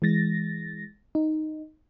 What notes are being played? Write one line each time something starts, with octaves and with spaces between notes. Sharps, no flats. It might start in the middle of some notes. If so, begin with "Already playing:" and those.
E3 G#3 A6 A#6
D#4